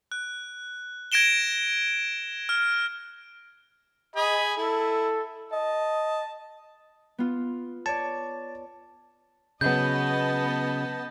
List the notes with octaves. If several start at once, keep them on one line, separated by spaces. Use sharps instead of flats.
F#6
G#6 A#6 D7 E7 G7
F6
G#4 D#5 G#5 B5
E4 A4
D#5 A5
B3 F4
C#5 D5 A5
C#3 F#3 B3 D#5 A5 G6